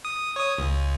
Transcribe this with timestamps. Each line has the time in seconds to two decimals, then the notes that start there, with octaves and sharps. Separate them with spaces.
0.05 D#6
0.36 C#5 D#6
0.58 C#2